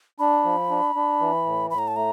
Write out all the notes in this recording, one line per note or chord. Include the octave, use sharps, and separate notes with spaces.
D4 B5
F3
D4
D4
E3
A2
A2 B5
A#5
A5
A3 A#5